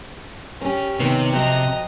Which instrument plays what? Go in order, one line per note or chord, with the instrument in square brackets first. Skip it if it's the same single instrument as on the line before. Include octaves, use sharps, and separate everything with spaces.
[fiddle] C#4 [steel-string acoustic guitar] G4 A#4
[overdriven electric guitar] C3 [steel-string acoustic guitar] D#3 B3 C#5
[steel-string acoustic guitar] F3 F#4 G5 [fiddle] D#5 A#5